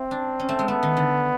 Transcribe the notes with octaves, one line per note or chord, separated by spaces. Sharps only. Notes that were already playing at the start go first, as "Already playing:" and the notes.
Already playing: C4 E4
D4
C#4
A3
G#3
A3 B3
D#3
D3